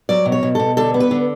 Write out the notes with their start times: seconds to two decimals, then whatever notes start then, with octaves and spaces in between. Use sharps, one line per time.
0.09 F#3 D5
0.26 B2
0.32 C#5
0.43 B2
0.55 B2 A4
0.77 D3 A4
0.94 B3
1.00 B4
1.11 D3